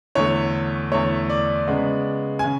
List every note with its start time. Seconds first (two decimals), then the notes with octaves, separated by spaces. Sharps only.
0.15 E2 D3 A3 C#5
0.92 E2 D3 A3 C#5
1.30 D5
1.68 C#3 G#3 B3
2.39 G#5
2.44 C#3